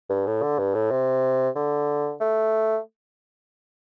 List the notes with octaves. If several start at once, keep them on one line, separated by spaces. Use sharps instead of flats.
G2
A2
D3
G2
A2
C3
D3
A3